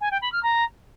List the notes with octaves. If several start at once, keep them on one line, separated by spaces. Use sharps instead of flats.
G#5
G5
B5
F6
A#5